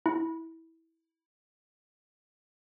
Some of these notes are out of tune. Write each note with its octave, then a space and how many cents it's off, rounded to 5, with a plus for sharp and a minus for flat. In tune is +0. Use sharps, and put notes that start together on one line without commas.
E4 -15